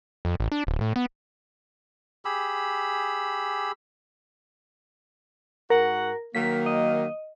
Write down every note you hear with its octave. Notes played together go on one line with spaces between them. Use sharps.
F2
A1
D4
D1
A2
B3
G4 G#4 B5 E6
G#2 F#4 A#4 F#5
D#3 F#3 A#3 B6
D#5